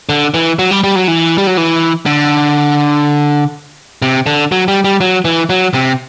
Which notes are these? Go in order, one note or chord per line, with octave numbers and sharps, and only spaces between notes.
D3
E3
F#3
G3
G3
F#3
E3
G3
F#3
E3
D3
C3
D3
F#3
G3
G3
F#3
E3
F#3
C3